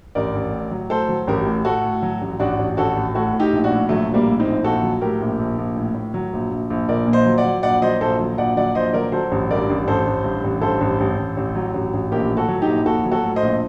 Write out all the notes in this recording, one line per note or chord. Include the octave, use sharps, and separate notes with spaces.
A1 A#4 D5
A1
A2
F#3
A2 A4 C5
F#3
A1 G4 A#4
A2
A2 F#4 A4
A2
F#3
A1
A1 D4 F#4
A1
A1 F#4 A4
A1
A2 F#4 A4
A2
D#4 G4
A#1
D4 F#4
A2
A#1 F#3 A3
A#1
G3 A#3
A2
C4 D#4
A#1
A#1 F#4 A4
F#3
A2 G4 A#4
A#1
A#1
A#1
A2
A2
F#3
A#1
A#1
A#1
A#1 A#4 D5
A#2
C5 D#5
F#3
D5 F#5
F#3
A#1 D5 F#5
F#3 C5 D#5
A#1 A4 C5
F#3
A#1 D5 F#5
F#3 D5 F#5
A#1 C5 D#5
F#3 A#4 D5
F#3 A4 C5
A1
G2 A#4 D5
A1
A1 A4 C5
A1
G2
A1
G2 A4 C5
A1
A1
A1
A1
F#3
A1
A1
A#1 G4 A#4
A2
F#4 A4
F#3
D#4 G4
A#1
A#1 F#4 A4
F#3
F#4 A4
A2
C5 D#5
A#1